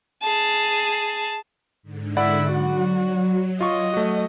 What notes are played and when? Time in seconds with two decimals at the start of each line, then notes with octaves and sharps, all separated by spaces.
0.22 G#4 A5
1.83 G#2 D3
2.17 E4 D5 F#5 B5
2.52 F#3 F#4
3.61 F4 D#5 C#6
3.94 A3 F#4